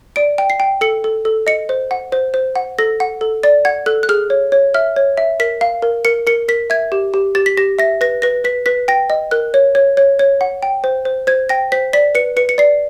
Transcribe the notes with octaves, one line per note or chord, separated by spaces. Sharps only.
D5 D7
G5
C7
G5
A4 C#7
A4
A4
D#5 C#7
C5
F#5
C5
C5
F#5
A4 A#6
F#5
A4
D5 A6
F#5 G#6
A4 F#6
F#6
G#4 F6
C#5
C#5
E5 F6
C#5
E5
A#4 B6
F5
A#4
A#4 C#7
A#4 C#7
A#4 B6
E5 G#6
G4
G4
G4 A6
B6
G4 A#6
E5 A#6
B4 A#6
B4 A#6
B4 B6
B4 B6
G5 A#6
D#5
A#4 F#6
C#5
C#5
C#5
C#5
F#5
G5
C5
C5
C5 G#6
G5 A#6
C5 B6
D5 B6
B4 C#7
B4 C#7
C#7
D5 C7